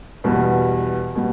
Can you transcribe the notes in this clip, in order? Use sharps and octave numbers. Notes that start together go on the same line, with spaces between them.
E2 B2 G3
B2 G3